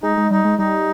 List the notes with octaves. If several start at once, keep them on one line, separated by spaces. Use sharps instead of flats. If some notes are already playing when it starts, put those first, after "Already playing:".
G#3 D#4
G#3
G3 D#4
G#3
G3 D#4